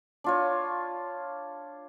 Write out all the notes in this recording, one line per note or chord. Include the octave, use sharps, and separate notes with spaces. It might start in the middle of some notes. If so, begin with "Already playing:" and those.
D4 F4 C#5